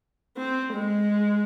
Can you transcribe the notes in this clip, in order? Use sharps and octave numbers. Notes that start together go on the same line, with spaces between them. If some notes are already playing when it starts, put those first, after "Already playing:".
C4
G#3